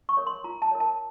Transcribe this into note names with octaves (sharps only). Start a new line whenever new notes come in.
C#6
A#4 C#5
C6
F4 A#5
A5
A#4 C#5
A5